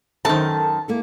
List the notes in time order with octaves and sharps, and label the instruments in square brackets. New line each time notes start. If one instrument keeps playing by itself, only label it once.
[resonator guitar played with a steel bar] F#2 D#3 [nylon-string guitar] A4 B4 C5 [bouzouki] A5
[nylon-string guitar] A#3 E4 A4